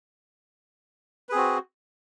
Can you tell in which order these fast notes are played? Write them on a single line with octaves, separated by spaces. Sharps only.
B4 G#4 C4 F#4